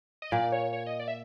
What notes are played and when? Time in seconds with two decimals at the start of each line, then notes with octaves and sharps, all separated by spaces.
0.22 D#5
0.31 A#2 D5
0.52 C#5
0.73 C#5
0.86 D#5
1.00 D5
1.08 E5